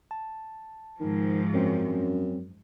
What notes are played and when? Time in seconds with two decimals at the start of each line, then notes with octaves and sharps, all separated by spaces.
0.11 A5
1.00 G#2 D#3 F3
1.54 F#2 F#3 C4 C#4